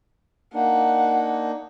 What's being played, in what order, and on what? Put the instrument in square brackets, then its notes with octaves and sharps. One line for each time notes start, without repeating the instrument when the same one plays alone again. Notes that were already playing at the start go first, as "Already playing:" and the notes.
[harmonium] A#3 D4 D#4 [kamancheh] F#5